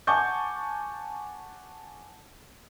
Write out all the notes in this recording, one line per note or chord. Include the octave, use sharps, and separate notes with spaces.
F#5 G#5 A5 C#6 D6 G6